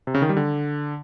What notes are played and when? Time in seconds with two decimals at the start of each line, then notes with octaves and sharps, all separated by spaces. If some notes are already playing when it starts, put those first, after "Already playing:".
0.07 C3
0.14 C#3
0.22 D#3
0.29 G3
0.37 D3